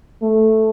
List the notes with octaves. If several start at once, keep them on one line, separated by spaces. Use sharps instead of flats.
A3